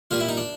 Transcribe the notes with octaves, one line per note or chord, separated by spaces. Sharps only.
A#2 G3 F4
E4
D#4
D4